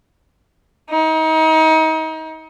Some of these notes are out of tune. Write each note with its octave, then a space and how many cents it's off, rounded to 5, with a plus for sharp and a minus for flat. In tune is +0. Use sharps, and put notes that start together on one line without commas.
D#4 +30